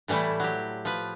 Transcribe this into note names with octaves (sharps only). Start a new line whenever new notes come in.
A2 E3 G3 A3 E4
F#3 G4
F3 B4